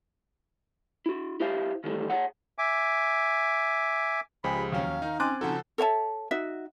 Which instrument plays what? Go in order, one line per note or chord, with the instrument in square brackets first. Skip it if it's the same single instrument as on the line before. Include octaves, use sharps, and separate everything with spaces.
[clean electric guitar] E4 F#4
E4 G4 C5 E5 F5
D#3 E3 G3 A3
G#4 A4 C#5 F#5
[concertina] E5 G#5 D6
[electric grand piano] C#2 G#3 C5 [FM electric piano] F3 G4 G#4 [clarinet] B5
[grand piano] D#2 F#3 C#4 [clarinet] F5
[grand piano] D#3 [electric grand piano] D#4
[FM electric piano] C4 C5 G#5 [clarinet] C#4 [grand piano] D6 F#6 A6
[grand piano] C#3 F3 F#4 [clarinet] D#4 [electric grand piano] A4 F#5
[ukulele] A4 C#5 E5 A5
D#4 F#4 E5